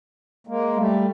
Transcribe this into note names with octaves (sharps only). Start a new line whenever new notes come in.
G#3 A#3
G3 A3